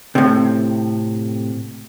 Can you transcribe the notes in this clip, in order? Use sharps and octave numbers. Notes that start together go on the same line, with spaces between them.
A2 C3